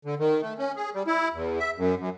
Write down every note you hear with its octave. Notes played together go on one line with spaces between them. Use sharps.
D3
D#3
A3
C#4
G#4
G3
E4
E2
E5
F#2
F#2